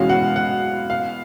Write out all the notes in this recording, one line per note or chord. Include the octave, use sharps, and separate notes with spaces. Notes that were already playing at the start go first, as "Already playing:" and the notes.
Already playing: E2 B2 G#3 C#4 F#4 F5
F#5
F#5
F5